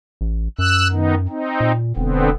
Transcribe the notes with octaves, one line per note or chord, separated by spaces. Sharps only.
A1
F#2 E6 F#6
D#3 B3 D#4
C4 D#4
A#2
E1 D3 B3 C4